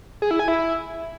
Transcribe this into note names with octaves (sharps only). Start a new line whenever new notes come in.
G#4
E4
G#5
E4